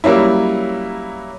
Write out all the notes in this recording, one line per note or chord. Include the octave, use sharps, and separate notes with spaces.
F#3 G3 A#3 C#4 E4